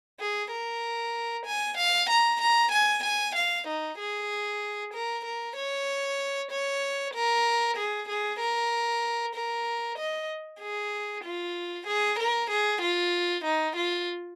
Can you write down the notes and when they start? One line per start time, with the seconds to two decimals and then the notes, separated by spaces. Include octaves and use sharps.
0.20 G#4
0.51 A#4
1.46 G#5
1.78 F5
2.09 A#5
2.41 A#5
2.72 G#5
3.04 G#5
3.36 F5
3.68 D#4
3.98 G#4
4.94 A#4
5.25 A#4
5.56 C#5
6.51 C#5
7.14 A#4
7.77 G#4
8.08 G#4
8.40 A#4
9.35 A#4
9.98 D#5
10.61 G#4
11.24 F4
11.87 G#4
12.19 A#4
12.50 G#4
12.82 F4
13.45 D#4
13.76 F4